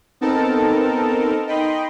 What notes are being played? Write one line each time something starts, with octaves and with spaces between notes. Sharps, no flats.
B3 C4 D#4 A4 A#4 A5
D#4 D#5 G5 B5 C6